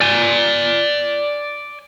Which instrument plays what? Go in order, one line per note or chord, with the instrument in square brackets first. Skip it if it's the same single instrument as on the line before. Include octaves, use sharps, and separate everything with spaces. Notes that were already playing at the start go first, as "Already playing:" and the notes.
[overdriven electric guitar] D5 G#5